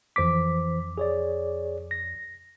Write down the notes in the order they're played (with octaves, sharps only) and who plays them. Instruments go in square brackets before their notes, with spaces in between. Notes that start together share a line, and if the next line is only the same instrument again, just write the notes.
[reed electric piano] F2 D6 [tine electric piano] E3 C5 B6
[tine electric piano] G#4 C#5 D5
A#6